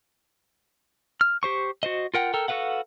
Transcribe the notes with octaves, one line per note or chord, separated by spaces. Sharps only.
F6
G4 C5 C#6
F#4 C5 D#5
F4 A#4 F#5 G5
A4 A#4 G5
F#4 A4 B4 F5 F#5